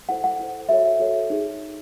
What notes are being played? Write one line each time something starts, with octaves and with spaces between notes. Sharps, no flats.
E4 A4 C5 F#5
F#5
E4 A4 C5
F#4 A4 C#5 E5
F#4 A4 C#5
D#4 G#4